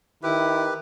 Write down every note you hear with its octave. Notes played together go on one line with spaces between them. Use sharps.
D#3 E4 G4 B4